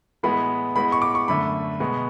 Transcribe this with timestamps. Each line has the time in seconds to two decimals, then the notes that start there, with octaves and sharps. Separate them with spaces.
0.23 A2 E3 G#3 B3 B5
0.76 A2 G#3 B3 B5
0.92 C#6
1.02 D6
1.15 C#6
1.28 F#2 D3 A3 B5
1.80 B2 G#3 B3